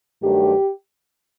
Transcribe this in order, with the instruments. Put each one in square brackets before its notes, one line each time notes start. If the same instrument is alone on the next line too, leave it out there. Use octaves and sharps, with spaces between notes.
[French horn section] G2 D#3 F#3 A3 G4